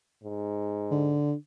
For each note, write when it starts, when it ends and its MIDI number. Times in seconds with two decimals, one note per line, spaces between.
0.24 1.20 44
0.91 1.34 50